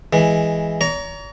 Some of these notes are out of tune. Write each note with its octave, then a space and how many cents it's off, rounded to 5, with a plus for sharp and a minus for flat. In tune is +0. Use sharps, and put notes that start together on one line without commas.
E3 +0 G#3 +0
C#5 +45 A#5 +0